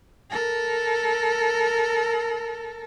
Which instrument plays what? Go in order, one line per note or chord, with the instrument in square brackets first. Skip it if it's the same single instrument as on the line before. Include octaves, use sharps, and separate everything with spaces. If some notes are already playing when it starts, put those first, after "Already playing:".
[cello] A4 A#4